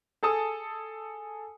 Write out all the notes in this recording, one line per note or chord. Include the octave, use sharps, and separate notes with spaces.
G#4 A4 A5 D#6